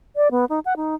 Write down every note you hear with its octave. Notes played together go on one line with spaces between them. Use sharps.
D5
B3
D#4
F#5
D#4